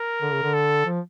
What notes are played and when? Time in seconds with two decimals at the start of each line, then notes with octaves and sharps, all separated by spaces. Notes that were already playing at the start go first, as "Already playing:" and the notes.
Already playing: A#4
0.21 D3
0.32 C#3
0.43 D3
0.54 A4
0.85 F3